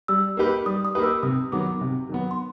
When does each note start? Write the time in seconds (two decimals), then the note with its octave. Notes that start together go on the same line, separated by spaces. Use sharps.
0.08 G3 E6
0.37 A#3 D#4 G4 B4
0.66 G3 D#6
0.85 D#6
0.95 A#3 D#4 G4 B4
1.04 E6
1.23 C3 D#6
1.52 D#3 F#3 B3 D6
1.81 C3
2.09 D#3 F#3 B3
2.31 C6